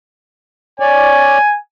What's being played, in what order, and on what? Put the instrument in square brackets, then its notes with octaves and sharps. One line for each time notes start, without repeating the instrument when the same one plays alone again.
[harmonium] C#5 D5 [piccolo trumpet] G#5